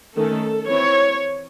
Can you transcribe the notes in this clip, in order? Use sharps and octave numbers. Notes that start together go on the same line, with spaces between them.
D#3 A3 C#4 A4
E3 C4 C#5